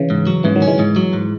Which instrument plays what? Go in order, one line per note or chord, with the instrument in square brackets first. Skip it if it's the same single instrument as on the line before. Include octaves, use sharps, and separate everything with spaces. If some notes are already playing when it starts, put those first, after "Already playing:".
Already playing: [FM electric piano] C#3 E3
[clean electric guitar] G#2
F#3
[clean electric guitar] G#2 [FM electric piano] C#3 E3
[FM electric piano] D#3 F#3
[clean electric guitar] C#4
[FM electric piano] E3 G#3
[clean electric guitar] G#2
F#3
G#2